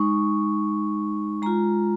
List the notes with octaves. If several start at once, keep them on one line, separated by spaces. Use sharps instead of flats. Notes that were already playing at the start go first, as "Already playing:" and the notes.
Already playing: G#3 D#4 C#6
G#3 F4 A#5